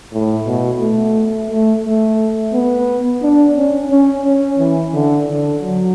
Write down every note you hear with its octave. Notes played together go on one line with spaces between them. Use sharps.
A2
B2
A3
A3
A3
B3
D4
C#4
C#4
C#4
E3
D3
D3
F#3